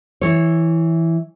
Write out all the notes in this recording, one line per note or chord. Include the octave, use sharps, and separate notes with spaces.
E3 C#5